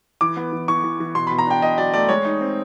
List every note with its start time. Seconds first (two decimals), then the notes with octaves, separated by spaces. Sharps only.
0.21 E3 D6
0.37 B3
0.52 E3
0.68 E3 C#6
0.84 E3
1.00 E3
1.15 B2 C6
1.27 B5
1.31 B2
1.39 A#5
1.47 D4 G5
1.62 B2 D#5
1.78 F#3 D5
1.94 A3 D5
2.09 G#3 C#5
2.25 D#4
2.41 C4